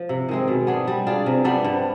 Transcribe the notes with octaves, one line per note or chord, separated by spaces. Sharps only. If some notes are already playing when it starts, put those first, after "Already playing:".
Already playing: F3
C3
D#3 G#3 C4
B2
B3 D4 G#4
G3
D4 F4 G#4
C3
G3 B3 D4
G2